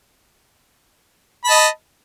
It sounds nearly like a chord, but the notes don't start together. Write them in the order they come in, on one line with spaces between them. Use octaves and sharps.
B5 A5 D#5